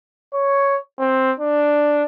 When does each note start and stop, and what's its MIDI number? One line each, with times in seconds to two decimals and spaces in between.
0.33 0.79 73
0.99 1.33 60
1.40 2.04 62